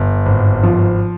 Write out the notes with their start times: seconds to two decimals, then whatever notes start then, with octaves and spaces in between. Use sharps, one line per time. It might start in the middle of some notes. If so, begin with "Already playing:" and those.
Already playing: G1
0.26 G#1
0.63 F3